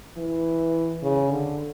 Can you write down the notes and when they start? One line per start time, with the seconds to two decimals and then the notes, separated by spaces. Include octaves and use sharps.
0.17 E3
1.02 C#3
1.31 D3